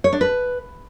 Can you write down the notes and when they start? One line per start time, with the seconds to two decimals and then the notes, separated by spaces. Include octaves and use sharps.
0.04 C#5
0.13 D4
0.21 B4